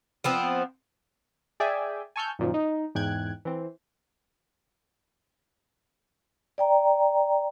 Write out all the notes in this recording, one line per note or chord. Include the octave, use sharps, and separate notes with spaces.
F3 B3 C4
G#4 D5 E5 G5 G#5
G#5 A5 C#6 E6 F6 G6
F#2 A#2 D#3 F3
D#4
E2 G#2 G5 F#6 G#6
E3 C4
D5 G5 A#5